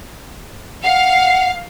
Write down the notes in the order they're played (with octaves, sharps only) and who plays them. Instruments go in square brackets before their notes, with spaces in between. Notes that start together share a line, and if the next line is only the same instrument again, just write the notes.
[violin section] F5 [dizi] F#5